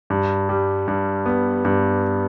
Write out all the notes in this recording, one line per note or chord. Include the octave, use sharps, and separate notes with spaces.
G2
G3
G2
B3
G2